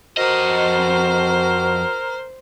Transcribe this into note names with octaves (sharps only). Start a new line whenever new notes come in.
F2 F#4 A#4 C5 D#5